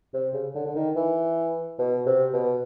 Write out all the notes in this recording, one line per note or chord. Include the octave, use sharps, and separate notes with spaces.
C3
C#3
D3
D3
D#3
E3
B2
C3
B2